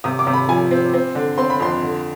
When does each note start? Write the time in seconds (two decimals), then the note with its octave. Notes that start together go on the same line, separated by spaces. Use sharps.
0.04 C3 D#6
0.19 D6
0.27 C3
0.33 B5
0.49 F3 G#5
0.71 C4
0.94 C4
1.15 D3
1.38 C4 C6
1.50 B5
1.60 F2 C6
1.82 D3